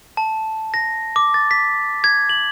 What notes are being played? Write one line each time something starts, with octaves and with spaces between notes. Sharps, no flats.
A5
A#6
D6
A6
B6
G#6
F#7